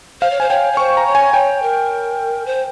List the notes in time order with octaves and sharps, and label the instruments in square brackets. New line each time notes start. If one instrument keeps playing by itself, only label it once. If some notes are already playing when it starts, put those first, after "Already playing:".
[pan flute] C5 [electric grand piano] F5
[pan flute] C#5
[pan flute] C5 [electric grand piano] G#5
[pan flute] C#5 [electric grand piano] G5
[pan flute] C#5
[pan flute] C5 [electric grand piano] C#6
[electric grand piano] A#5
[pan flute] C#5
[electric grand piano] G#5
[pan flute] C#5 [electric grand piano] G5
[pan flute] A#4
C5